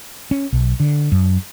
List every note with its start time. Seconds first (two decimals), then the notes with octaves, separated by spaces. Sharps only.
0.31 C#4
0.53 B1
0.80 D3
1.12 F#2